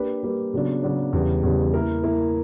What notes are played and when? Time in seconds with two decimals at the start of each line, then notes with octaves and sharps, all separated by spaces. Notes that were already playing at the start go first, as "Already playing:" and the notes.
Already playing: A#3 D4 G4 B4
0.23 G3 A#3 D4 G4 B4
0.54 C#3 F#3 B3 D4
0.83 C#3 F#3 B3 D4
1.13 E2 C#3 G3
1.44 E2 C#3 G3
1.74 A#3 E4 A#4
2.03 A#3 E4 A#4